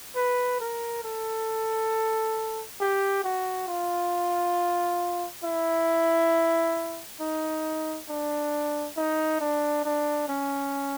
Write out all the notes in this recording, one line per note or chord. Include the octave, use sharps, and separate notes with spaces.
B4
A#4
A4
G4
F#4
F4
E4
D#4
D4
D#4
D4
D4
C#4